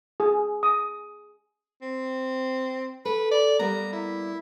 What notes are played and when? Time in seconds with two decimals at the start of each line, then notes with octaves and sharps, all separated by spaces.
0.20 G#4
0.63 D#6
1.82 C4
3.05 A4 B4
3.31 D5
3.59 G3 A#3 B3 A#5
3.93 E4